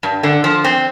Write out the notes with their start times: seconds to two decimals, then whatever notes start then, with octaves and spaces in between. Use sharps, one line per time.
0.03 G2
0.23 D3
0.44 F3
0.64 C4